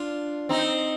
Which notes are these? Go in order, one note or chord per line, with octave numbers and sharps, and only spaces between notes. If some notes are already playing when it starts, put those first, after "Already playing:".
Already playing: D4 F4
C4 D#4